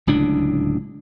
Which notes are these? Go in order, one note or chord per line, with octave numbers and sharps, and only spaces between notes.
D1 C#2 A2 D4